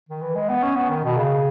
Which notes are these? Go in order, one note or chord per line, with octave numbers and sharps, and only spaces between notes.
D#3
E3
G#3
B3
C#4
B3
D#3
B2
C#3